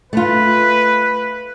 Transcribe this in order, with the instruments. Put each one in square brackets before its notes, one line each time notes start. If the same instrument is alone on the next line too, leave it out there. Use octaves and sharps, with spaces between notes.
[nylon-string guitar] A3 F4 [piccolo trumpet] B4